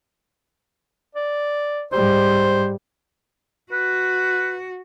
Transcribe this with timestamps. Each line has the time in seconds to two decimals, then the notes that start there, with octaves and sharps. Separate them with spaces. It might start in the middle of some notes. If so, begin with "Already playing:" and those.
1.15 D5
1.92 G#2 G3 C5
3.72 F#4 B4